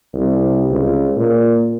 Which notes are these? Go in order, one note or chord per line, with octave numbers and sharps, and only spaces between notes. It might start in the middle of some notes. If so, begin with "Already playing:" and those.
C2
C#2
A#2